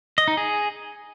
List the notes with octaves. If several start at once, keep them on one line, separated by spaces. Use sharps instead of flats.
D#5
D#4
G#4